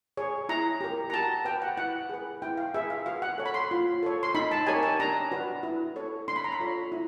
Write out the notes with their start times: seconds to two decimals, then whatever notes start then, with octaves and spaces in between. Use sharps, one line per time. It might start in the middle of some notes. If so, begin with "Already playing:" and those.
0.17 G#4 C#5
0.49 E4 A#5
0.81 G4 A#4
1.10 A#5
1.13 F#4 A5
1.45 B4 G5
1.62 F#5
1.77 E4 F#5
2.09 G#4 B4
2.42 E4 G5
2.57 F5
2.74 G#4 B4 E5
2.90 F5
3.06 F#4 F5
3.22 F#5
3.38 A4 C#5
3.46 B5
3.54 C6
3.71 F4
4.03 A4 C#5
4.23 C6
4.35 D#4 B5
4.51 A5
4.67 G4 A#4 C#5 G#5
4.83 A5
4.99 D4 A#5
5.32 F#4 B4
5.63 E4
5.96 A4 C#5
6.28 D4 C6
6.36 B5
6.44 A#5
6.52 B5
6.60 F4 A4 C#5
6.92 E4